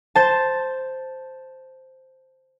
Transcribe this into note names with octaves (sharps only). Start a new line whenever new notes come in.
C5 A5